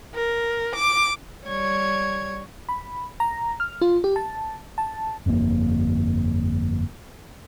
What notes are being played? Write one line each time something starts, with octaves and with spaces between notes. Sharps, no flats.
A#4
D6
G3 C#5 G#6
B5
A#5
F6
F4
G4
A5
A5
G1 F2 A2 A#3